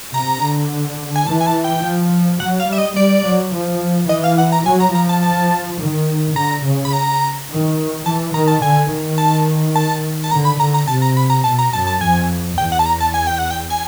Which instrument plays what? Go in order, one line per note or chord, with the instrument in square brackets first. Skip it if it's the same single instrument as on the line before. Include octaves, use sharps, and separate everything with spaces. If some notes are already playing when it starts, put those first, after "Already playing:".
[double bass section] C3 [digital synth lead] A#5
[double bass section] D3
[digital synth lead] G#5
[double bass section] E3 [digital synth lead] A5
[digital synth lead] G#5
A5
G5
[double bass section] F3
[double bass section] F#3 [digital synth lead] F#5
[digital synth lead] F5
[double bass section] G3 [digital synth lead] E5
[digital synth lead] D#5
[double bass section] G3 [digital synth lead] D5
[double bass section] F#3
F3
[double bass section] E3 [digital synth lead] D#5
[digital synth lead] F5
F#5
A#5
[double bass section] F#3 [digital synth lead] G#5
[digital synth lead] A#5
[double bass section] F3 [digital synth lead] A#5
[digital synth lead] A5
A5
[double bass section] D#3
[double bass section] D3 [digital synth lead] A#5
[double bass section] C#3
[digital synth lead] B5
A#5
[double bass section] D#3
[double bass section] E3 [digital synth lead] A5
[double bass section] D#3 [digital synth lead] A#5
[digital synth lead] A5
[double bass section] D3 [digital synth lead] G#5
[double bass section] D#3
[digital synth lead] A5
A5
A5
[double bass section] D3 [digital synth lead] A#5
[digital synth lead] B5
[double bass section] D3 [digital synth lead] A#5
[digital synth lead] A#5
[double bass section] C3 [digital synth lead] A5
[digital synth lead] A#5
B5
A#5
[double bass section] B2 [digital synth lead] A5
[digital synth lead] A#5
[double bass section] F#2 [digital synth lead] A5
[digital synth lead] A5
[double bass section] F2 [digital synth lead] G#5
[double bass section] E2 [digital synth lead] G5
[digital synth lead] F#5
A5
A#5
A5
G#5
G5
F#5
G5
G#5